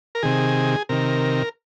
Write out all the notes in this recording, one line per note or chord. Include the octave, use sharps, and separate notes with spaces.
A#4
C3 D#3 G#4
C3 D#3 A#4